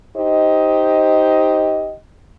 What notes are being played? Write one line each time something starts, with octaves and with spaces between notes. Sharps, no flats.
D#4 G4 C5 D#5